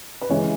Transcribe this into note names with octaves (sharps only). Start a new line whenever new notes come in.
B4
C#3 E3 G#3 C#5